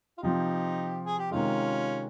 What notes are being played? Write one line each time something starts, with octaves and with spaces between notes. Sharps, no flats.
F4
C3 F3 C4 D#4 G4
G#4
G4
C3 D#3 G#3 C#4 F4